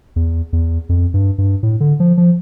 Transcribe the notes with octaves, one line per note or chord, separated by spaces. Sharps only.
E2
E2
F2
G2
G2
A2
D3
F3
F3